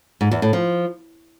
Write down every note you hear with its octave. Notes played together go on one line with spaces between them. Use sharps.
G#2
E2
A2
F3